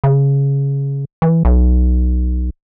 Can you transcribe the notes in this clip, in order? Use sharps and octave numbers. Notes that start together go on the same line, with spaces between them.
C#3
E3
B1